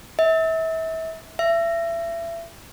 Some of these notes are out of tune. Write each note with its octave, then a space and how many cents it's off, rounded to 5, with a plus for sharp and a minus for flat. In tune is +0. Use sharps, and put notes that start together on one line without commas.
E5 -30
E5 +30